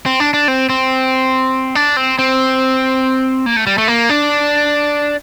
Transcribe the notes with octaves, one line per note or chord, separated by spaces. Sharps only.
C4
D4
D4
C4
C4
D4
C4
C4
A#3
A3
G3
A3
A#3
D4